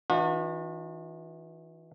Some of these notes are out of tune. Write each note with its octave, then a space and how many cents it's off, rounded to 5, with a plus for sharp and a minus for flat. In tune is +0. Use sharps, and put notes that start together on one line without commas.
E3 -25 D4 +40 F#4 -40